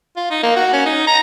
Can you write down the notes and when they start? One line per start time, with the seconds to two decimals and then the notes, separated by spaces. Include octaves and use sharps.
0.17 F4
0.30 D#4
0.43 A#3
0.56 F#4
0.73 C#4
0.86 D#4
1.07 A#5